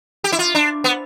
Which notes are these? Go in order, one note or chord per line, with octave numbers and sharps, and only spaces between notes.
G4
E4
F4
D4
B3